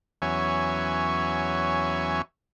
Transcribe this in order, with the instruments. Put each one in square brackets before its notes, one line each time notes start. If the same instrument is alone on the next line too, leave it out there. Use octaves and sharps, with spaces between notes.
[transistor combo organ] E2 F#3 C#4 E5 G#5 C#6